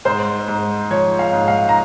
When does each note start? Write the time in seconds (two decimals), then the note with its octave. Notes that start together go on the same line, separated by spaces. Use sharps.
0.05 G#2 C5
0.48 G#2
0.90 F3 C#5
1.19 F5
1.33 G#2
1.48 F5
1.69 A#5